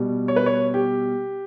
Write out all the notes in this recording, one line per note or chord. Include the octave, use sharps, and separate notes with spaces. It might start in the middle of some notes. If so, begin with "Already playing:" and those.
Already playing: B2 G3
C#5
B4
C#5
G4